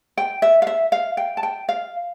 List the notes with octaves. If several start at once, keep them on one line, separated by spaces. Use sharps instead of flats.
G5
E5
F5
E5
F5
G5
A5
G5
F5